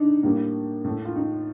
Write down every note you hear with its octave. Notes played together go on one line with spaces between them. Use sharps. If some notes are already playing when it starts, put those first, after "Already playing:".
Already playing: D4 D#4
A2 G3 A#3
A2 A3
F4
D#4